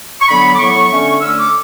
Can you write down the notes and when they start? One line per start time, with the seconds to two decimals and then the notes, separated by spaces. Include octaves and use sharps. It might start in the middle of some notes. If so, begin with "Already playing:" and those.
0.21 C#6
0.28 D3 F#3 B3 B5
0.55 D6
0.59 A2 F#3 B3 C#6
0.91 D3 A3 C#4
1.21 D3 A3 C#4 E6
1.37 D6